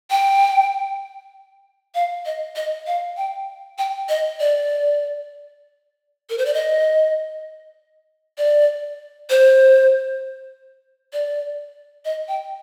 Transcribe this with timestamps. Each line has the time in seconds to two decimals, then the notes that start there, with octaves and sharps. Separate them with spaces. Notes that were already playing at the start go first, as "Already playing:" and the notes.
0.11 G5
1.95 F5
2.26 D#5
2.56 D#5
2.87 F5
3.17 G5
3.78 G5
4.09 D#5
4.40 D5
6.30 A#4
6.38 C5
6.45 D5
6.54 D#5
8.38 D5
9.30 C5
11.13 D5
12.05 D#5
12.28 G5